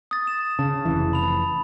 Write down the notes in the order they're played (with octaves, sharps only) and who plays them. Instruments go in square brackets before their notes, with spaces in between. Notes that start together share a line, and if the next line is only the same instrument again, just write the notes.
[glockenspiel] D#6 A6
E7
[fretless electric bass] C#3 [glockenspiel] A5
[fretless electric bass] F1 E3
[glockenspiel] B5 F7